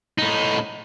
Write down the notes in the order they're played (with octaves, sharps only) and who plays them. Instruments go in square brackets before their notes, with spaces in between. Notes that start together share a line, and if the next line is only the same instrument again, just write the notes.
[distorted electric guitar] A2 D#4